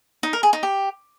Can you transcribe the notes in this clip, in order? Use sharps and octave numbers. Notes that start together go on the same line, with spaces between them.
D#4
A#4
G#4
D#4
G4